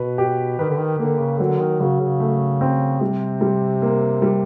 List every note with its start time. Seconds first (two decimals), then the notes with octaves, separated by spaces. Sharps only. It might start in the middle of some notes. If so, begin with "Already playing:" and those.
Already playing: B2 B4
0.18 G4
0.59 D#3 B4
0.69 D3
0.78 D#3
0.98 D3 A#3
1.19 C#3
1.40 D3 F#3
1.59 D#3
1.80 C#3 F#3
2.00 C#3
2.20 A3
2.61 C4
3.01 C3 G3
3.41 G3
3.82 A#3
4.22 G3